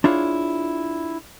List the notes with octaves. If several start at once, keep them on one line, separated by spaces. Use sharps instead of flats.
D4 E4 F4 G#4 C#5